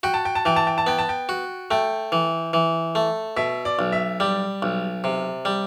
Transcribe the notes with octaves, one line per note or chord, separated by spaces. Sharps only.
F#4 G5
A5
G5
A5
E3 G5
A5
G5
A5
B3 G5
A5
G5
F#4
A3 G5
E3
E3
A3
B2 E5
D5
B1
E5
G3 D5
B1
C3
G3